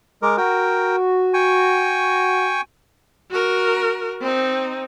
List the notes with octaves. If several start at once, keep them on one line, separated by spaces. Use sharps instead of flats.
G#3 A#4 D6
F#4 A#4 G5
G5 G#5 C#6
F#4 A#4
C4 D#4